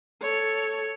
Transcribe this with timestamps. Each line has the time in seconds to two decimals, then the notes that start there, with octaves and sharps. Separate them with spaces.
0.22 A4 C#5